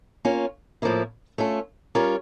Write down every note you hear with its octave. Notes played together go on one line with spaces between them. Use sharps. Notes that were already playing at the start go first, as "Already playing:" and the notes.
A#3 C#4 F4 C#5
A2 F3 A#3 E4
A3 C#4 F4 A4
G3 C#4 F4 A#4 C#5